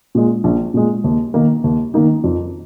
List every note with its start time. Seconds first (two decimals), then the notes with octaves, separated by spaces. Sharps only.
0.15 A#2 G#3
0.44 A#1
0.74 A#2 G#3
1.04 D#2
1.34 D#3 A#3 D#4
1.64 D#2
1.94 D#3 A#3 D#4
2.24 F2